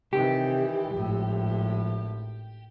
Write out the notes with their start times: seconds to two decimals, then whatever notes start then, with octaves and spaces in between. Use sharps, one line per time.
0.13 C3 D#3 E3 G4
0.94 G#1 A2 F3